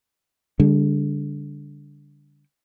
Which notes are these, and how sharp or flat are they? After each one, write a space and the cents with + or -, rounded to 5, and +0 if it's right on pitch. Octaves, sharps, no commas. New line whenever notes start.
D3 -20 G3 +35